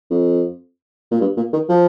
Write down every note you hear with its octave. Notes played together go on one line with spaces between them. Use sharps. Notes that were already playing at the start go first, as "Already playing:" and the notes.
F2
A#2
G2
A#2
D#3
F3